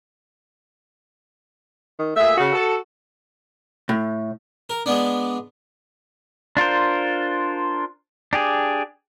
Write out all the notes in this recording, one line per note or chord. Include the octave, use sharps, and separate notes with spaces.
D#3
A#2 A3 G#4 E5
C#3 F#4
A4
A2
A#4
G#3 B3 D4
D4 F4 A#4 C5
D4 G4 G#4